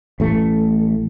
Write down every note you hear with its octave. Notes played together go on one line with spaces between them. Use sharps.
A1 A3